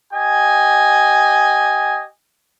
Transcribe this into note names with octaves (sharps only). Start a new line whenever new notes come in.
G4 D#5 G#5